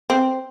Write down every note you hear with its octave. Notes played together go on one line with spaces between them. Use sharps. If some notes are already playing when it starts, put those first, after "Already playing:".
C4